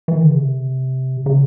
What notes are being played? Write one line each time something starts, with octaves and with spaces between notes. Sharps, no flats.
E3
D#3
D3
C#3
C3
C#3